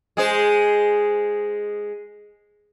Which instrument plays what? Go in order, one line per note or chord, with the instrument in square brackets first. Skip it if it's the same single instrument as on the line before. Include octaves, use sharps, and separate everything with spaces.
[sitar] G#3 G#4 C5